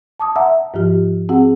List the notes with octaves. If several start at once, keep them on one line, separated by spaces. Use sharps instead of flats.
A5 D6 D#6
E5 F#5 A5 A#5 E6
G#2 F3 F4 G4
C4 F#4 G#4 F#5